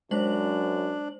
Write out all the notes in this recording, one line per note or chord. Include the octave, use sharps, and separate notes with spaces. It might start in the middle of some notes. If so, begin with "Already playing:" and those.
F#2 G#3 D4 C5 F#7